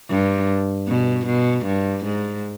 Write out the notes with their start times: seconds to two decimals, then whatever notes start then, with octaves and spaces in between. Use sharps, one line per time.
0.10 G2
0.88 B2
1.26 B2
1.66 G2
2.05 G#2